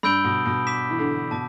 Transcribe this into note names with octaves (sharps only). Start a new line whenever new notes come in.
G2 B5 E6 G6 D7 G7
B2
B2
D6 B6 E7
E3
D3
B2 A5 D6